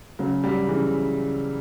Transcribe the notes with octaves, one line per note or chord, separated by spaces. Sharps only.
C#3 F#3
F#3 G3
C#3 E3